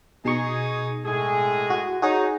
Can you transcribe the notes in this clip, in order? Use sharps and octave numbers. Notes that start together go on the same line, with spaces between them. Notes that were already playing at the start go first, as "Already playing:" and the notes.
B2 D#4 G#4 C#6
A2 G#3 G#4
F#4
D#4 F#4 G#4 C#5